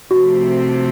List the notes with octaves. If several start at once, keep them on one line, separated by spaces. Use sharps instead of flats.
C3 F3 A3 C4 F#4